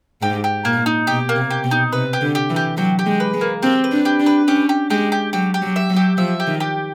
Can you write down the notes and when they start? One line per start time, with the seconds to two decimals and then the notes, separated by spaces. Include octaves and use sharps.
0.22 G#2 G4
0.44 G4
0.65 A#2 A#3
0.86 D#4
1.07 B2 G4
1.29 A#3
1.35 C3
1.50 G4
1.64 B2
1.71 D#4
1.92 C3 B4
2.13 G4
2.21 D3
2.35 G4
2.50 E3
2.56 G4
2.77 F#3 G4
2.99 G4
3.06 G#3
3.20 B4
3.34 G#3
3.41 A#3
3.62 C4 G4
3.84 B4
3.92 D4
4.05 G4
4.20 D4
4.26 B4
4.47 C#4 G4
4.69 G4
4.90 G#3 G4
5.12 G4
5.33 F#3 G4
5.54 G4
5.62 F#3
5.76 E5
5.89 F#3
5.96 G4
6.17 F3 E5
6.40 G4
6.47 D#3
6.60 G4